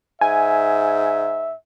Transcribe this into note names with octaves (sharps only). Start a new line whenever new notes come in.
G#2 E5 G#5